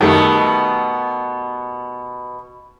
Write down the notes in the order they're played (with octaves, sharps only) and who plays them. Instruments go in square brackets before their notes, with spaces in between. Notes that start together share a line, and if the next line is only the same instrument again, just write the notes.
[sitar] B2 B3 [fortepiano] D#3 G3 A3